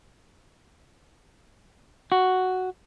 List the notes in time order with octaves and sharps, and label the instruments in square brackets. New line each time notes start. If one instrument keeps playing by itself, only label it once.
[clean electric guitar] F#4